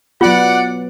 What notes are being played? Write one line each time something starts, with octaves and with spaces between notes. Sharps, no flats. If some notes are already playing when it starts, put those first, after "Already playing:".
F#3 B3 F4 D5 F#5